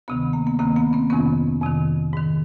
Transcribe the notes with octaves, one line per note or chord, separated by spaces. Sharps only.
D2 C3 D#3 B3
A#3
B3
D2 C3 D#3 A#3 C4
B3
A#3 C4
F2 C3 D#3 B3 C#4
F2 C3 D#3
G#2 D#3